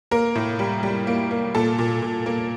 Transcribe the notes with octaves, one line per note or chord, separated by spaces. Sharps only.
A#3 A#4
A2
G3
G3
A#3
A#3
A#2 A4
A#2
A#2
A#3